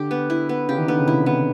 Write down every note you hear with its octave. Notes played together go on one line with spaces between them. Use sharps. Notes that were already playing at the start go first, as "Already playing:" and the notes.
Already playing: D3 G4
B3
E4
B3
C#3 G4
D#3
D3 B3
C#3
C3 E4
B3